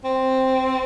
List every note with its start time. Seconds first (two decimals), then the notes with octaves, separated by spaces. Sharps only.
0.04 C4